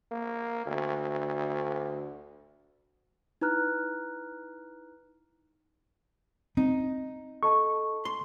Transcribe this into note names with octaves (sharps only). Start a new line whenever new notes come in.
A#3
D2
D#4 E4 B4 A#5 F6 F#6
C4 D#4
A4 D#5 A5 C#6
C6